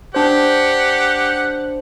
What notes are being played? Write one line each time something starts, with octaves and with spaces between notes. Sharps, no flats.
D4 G4 C5 F#5